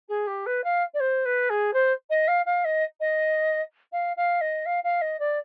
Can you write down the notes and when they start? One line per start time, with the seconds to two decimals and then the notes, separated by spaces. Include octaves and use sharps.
0.08 G#4
0.27 G4
0.46 B4
0.63 F5
0.94 D5
1.00 C5
1.25 B4
1.49 G#4
1.73 C5
2.10 D#5
2.27 F5
2.45 F5
2.64 D#5
3.00 D#5
3.92 F5
4.16 F5
4.41 D#5
4.65 F5
4.83 F5
5.01 D#5
5.19 D5